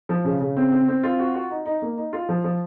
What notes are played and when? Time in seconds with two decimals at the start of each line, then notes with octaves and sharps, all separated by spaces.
0.09 F3
0.24 C#3
0.40 C#3
0.57 C4
0.72 C4
0.88 C4
1.03 F4
1.19 F#4
1.35 F#4
1.50 D#4
1.66 D#4
1.82 A#3
1.97 D#4
2.13 F4
2.29 F3
2.44 F3